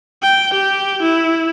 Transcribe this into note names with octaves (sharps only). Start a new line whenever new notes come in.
G5
G4
E4